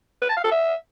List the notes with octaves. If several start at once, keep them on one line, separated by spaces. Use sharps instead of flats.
B4
A5
F5
A4
E5